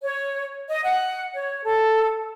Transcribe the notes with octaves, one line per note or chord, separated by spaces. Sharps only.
C#5
D#5
F#5
C#5
A4